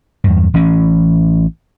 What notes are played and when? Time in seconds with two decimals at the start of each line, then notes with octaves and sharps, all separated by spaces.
0.24 E2 G2
0.54 A1 E3 C#4